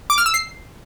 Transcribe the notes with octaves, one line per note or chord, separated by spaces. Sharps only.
D6
F6
E6
C7